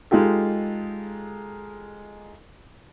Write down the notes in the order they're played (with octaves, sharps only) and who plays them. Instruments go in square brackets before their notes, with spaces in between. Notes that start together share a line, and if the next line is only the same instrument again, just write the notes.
[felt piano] G#3 D#4 F4 G4 A4